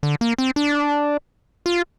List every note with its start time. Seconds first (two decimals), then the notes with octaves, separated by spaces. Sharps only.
0.03 D3
0.21 A#3
0.38 C4
0.56 D4
1.66 F4